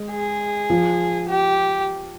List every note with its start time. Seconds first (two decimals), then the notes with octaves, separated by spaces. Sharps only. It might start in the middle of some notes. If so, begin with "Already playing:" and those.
Already playing: G#3
0.11 G#4
0.70 F3 F4
1.29 G4